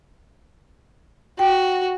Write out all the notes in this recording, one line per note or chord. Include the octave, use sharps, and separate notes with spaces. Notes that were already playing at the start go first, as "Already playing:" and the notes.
F#4 G5